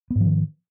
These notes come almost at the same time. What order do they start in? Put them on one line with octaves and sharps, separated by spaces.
B3 G#2 F3 D#3